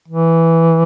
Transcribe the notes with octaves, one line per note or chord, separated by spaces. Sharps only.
E3